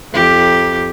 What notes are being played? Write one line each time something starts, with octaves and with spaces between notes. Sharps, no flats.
F2 G4